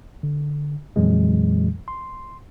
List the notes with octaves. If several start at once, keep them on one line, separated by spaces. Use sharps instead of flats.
D3
F2 A#2 E3 F#3 G#3
C6